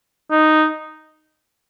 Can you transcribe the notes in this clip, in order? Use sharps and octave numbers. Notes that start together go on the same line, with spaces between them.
D#4